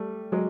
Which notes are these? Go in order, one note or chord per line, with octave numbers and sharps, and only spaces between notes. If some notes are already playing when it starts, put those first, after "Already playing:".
Already playing: G3 A3
F#3 G#3